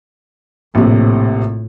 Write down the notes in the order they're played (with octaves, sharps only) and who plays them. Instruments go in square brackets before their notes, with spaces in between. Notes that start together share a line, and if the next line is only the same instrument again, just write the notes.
[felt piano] A#1 C3 [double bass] A2